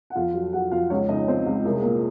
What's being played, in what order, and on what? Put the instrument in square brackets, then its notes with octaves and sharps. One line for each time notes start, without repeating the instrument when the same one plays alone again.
[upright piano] F#5
F2 F4 F5
F#3
F#3 F#4 F#5
F2 F4 F5
C#2 C#4 C#5
C#3 D#4 D#5
F3 C4 C5
C#2
C2 A#4
G#4
A#2 A#3 A#4